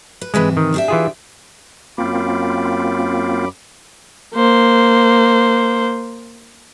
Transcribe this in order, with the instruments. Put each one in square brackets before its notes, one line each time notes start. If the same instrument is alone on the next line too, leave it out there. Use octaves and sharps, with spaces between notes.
[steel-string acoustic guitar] B4
[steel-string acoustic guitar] G#2 C3 E3 [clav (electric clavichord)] G#3 B4
[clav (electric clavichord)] D#3
[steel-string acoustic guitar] D4 G4 E5
[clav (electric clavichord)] E3 F4 G#4
[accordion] F#2 B5 D6 [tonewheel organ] A#3 C4 F4
[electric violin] A#3 C5